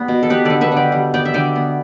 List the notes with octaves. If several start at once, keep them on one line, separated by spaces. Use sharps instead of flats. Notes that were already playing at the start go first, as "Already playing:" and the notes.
Already playing: G3 B3
B2
A4
B3 G4 B4
D3 A4 D5
B4 E5
D3 D5 G5
G3
B3 D5 G5
E5
D3 D5 G5
B3